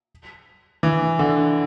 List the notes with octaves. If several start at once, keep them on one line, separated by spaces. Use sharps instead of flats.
E3
D3